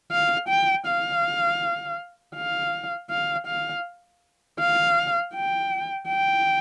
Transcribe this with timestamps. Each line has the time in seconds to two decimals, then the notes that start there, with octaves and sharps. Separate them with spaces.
0.11 F5
0.49 G5
0.86 F5
2.35 F5
3.10 F5
3.47 F5
4.59 F5
5.34 G5
6.08 G5